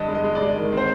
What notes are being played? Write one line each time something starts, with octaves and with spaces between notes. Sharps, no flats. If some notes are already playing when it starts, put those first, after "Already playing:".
Already playing: G2 D3 D#5
G#3
D#5
G#3
D5
G#3
D#3
C4
C5